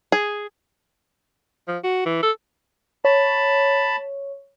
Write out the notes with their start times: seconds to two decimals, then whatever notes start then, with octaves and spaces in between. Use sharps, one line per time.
0.12 G#4
1.68 F3
1.84 F#4
2.06 E3
2.23 A4
3.05 C#5 A5 B5